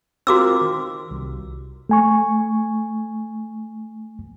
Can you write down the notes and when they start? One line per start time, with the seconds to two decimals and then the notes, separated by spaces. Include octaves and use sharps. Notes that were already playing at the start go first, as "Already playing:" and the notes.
0.27 C4 F4 F#4 A#4 D6 E6
0.61 D#3
1.11 C2
1.89 A3 G#5 C#6